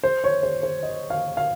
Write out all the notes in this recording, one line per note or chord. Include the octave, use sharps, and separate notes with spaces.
C5
C#5
C5
C5
D#5
F5
F5